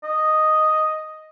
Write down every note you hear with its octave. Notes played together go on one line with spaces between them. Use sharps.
D#5